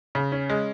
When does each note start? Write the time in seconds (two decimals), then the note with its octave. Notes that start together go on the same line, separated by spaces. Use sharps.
0.15 C#3
0.32 C#4
0.50 G#3